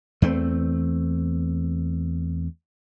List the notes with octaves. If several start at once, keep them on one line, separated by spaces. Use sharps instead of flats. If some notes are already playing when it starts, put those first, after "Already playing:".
E2 A3 C4